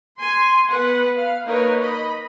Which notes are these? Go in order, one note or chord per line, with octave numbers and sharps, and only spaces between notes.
G#5 C6
B3 B4 F#5
F5
A#3 D#4 A#4 B4 C#5
D#5 B5